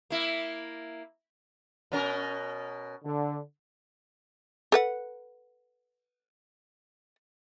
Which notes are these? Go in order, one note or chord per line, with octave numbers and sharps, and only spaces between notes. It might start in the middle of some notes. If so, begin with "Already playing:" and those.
A#3 E4
B2 C#4 A#4
D3
A4 B4 F#5